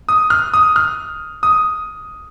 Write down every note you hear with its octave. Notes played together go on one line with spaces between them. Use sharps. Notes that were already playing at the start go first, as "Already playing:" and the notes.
D#6
F6
D#6
F6
D#6